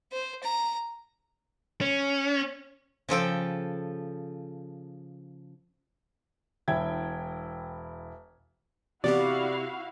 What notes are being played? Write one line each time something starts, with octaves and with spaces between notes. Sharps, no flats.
C5
A#5
C#4
C#3 F3 A4 G5
E1 E4 G5 G#6
C3 E3 B3 E4 F#4 G4 D5 F5